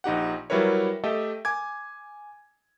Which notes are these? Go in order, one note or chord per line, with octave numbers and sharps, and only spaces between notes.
A#1 D#4 G4 F#5
F#3 G3 E4 A#4 B4 C#5
A3 G4 A4 D#5 E5
G#5 D6 G#6